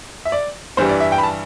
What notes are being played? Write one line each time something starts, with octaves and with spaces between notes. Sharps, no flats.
E5
D5
G2 E3 G3 C5
D5
E5
G5
B5
A5